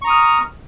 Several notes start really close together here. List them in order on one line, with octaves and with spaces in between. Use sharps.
C#6 A#5 D#6 F6